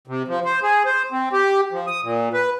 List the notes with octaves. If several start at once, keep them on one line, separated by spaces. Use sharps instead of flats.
C3
F3
C5
G#4
C5
C4
G4
F3
D#6
A#2
B4